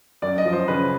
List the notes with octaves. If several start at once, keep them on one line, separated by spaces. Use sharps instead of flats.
F#2 D5
D#5
F3
C5
C#3 B4